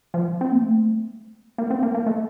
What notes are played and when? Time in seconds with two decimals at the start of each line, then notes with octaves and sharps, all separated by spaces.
0.14 F3
0.41 C4
0.52 A#3
0.62 A3
1.58 A#3
1.70 C4
1.83 A#3
1.94 A#3
2.06 A3